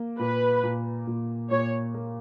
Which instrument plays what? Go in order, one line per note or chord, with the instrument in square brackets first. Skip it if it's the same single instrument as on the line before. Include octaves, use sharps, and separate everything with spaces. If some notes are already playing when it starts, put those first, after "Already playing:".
Already playing: [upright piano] A#3
[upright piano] A#2 [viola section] B4
[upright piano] A#2
A#2
[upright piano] A#2 [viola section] C#5
[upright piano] A#3